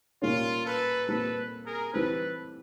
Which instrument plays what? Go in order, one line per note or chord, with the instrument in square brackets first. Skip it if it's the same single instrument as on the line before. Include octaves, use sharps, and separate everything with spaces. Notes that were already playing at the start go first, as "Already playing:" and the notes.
[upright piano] A#2 G3 A#3 C#4 [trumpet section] F4
[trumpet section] A4 B4
[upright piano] A#2 G3 C4 [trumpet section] A4 B4
[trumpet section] G#4 A#4
[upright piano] E3 G3 C4 [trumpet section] A4 B4